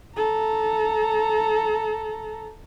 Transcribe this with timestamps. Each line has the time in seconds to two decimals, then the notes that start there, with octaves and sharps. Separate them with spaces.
0.16 A4 A#5